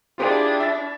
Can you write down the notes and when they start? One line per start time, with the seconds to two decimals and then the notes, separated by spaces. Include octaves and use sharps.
0.18 D4 E4 F4 G4 G#4
0.60 E5 A6